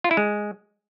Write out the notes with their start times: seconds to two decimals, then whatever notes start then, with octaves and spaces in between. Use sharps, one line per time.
0.04 F4
0.11 E4
0.17 G#3